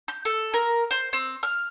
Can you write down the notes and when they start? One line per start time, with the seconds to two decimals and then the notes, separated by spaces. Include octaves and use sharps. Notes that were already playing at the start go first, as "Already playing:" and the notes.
0.08 G6
0.25 A4
0.54 A#4
0.91 C5
1.13 C4
1.43 F6